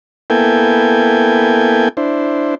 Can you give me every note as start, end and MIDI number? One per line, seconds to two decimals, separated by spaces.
0.30 1.89 58
0.30 1.89 59
0.30 1.89 64
0.30 1.89 69
0.30 1.89 79
0.30 1.89 80
1.97 2.55 62
1.97 2.55 64
1.97 2.55 72